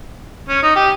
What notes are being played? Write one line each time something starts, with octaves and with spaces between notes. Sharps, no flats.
C#4
D#4
G4